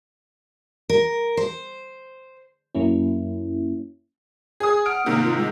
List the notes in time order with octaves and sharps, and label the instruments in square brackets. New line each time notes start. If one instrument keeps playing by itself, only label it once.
[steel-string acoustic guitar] A#4
C5
[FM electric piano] F#2 F#3 A#3 C#4 E4
[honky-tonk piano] G#4 D#6
[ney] F#5 [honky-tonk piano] F6 D7
[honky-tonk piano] G#2 C3 D#3 [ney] A#3
[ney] F4
G#3